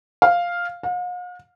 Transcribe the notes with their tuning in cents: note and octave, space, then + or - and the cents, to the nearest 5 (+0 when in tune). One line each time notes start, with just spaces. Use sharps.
F5 +0
F5 +45